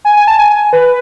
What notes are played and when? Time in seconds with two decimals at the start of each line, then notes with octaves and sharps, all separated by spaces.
0.05 G#5
0.16 G#5
0.28 A5
0.39 G#5
0.50 G#5
0.73 B4